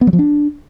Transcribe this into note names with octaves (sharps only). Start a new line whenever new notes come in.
B3
F#3
F3
D4